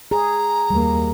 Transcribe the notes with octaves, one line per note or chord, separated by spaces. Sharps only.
G#4 A#5
D#2 G3 A#3